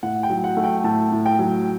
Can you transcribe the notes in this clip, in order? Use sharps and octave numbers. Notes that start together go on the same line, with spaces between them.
A2 F#5
G5
F#3
F#5
A3
G5
A2 A5
A2
G5
F#3